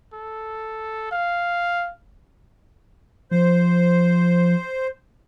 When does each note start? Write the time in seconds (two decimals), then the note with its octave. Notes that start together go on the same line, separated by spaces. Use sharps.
0.14 A4
1.12 F5
3.31 F3 C5